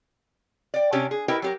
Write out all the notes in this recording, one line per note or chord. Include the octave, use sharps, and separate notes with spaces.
D5 G5
C3 C#4 D4 G4
G#4
E4 G4 A#4 B4 D#5 G5
F#3 G4 A#4